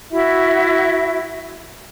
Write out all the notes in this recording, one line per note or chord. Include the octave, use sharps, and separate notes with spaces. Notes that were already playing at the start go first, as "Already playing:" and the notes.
E4 F#4 E5